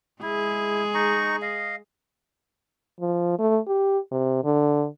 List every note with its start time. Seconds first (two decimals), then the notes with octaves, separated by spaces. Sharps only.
0.23 G#3 E4 G#4
0.94 D#4 A#5 C#6
1.42 D#5 F5
3.01 F3
3.39 A3
3.68 G4
4.12 C3
4.44 D3